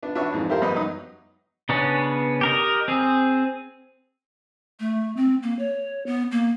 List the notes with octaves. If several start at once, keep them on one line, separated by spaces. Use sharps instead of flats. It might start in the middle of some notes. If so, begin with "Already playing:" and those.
B3 D4
D4 F#4 B4 C#5 E5
F2 G#2 E3
E4 G4 A4 A#4 C5 F5
F#2 G3 B4 D#5
F#3 D#4 D#6
C#3 B3 C#4 D4
G4 A#4 D#5
C4 G#4
A3
C4
A#3
C#5
B3
A#3